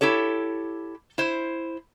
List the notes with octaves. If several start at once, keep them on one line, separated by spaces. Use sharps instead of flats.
E4 G4 A4 C#5
E4 C5